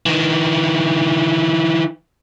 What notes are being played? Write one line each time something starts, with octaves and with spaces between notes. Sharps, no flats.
D#3 E3